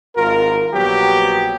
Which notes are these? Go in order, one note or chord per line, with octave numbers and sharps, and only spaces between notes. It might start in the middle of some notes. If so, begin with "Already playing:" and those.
G#1 F4 A#4
A#1 F#3 B3 G4